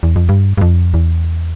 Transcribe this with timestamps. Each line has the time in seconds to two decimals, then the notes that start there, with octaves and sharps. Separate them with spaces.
0.03 E2
0.16 F2
0.29 G2
0.57 G2
0.61 F2
0.94 E2